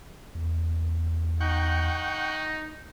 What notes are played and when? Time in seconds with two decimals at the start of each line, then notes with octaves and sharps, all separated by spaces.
0.35 E2
1.41 D#4 F#5 G5 C#6